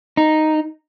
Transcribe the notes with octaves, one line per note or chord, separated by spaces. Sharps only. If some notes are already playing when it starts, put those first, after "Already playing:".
D#4